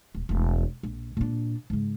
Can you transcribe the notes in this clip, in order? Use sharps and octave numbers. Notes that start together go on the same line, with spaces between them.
D#1
E1 A3
A#1
A#2 D4
G#2 C#3